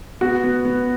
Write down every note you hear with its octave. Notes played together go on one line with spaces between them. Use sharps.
B3 F#4
B3
B3